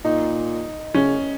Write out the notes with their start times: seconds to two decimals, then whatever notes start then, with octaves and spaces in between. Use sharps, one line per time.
0.05 A#2 D#4
0.94 C#3 C#4